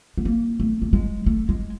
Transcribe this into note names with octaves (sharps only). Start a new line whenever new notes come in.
A3
A#3
A3
A3
G#3
A3
G#3